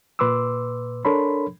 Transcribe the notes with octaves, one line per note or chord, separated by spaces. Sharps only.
A#2 B4 C6 D6 E6
D4 A4 A#4 C#5 B5 C6